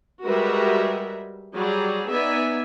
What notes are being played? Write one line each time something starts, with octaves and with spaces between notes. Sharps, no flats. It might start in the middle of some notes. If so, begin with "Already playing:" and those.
G3 G#3 F#4 A#4 B4 E5
F#3 G3 G#4 D5
B3 D#4 D5 E5 G#5